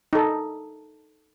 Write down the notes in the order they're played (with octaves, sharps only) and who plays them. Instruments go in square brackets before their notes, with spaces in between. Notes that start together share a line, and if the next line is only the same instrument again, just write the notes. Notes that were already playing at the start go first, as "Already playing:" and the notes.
[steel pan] D#4 A4